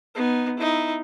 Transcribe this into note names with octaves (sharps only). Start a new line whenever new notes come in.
B3 D#4
D#4 E4